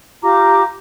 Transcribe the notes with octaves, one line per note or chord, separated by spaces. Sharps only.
F4 G4 A#5 D6